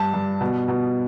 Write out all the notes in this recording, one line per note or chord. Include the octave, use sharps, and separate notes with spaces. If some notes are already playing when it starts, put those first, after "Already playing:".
Already playing: G2 A5
G2
B2
B2